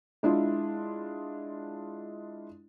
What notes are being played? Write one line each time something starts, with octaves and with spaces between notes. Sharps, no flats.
G#3 D4 E4 F4